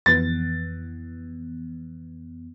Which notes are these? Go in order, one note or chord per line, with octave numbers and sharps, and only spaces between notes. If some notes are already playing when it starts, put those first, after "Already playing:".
F2 E3 B3 A6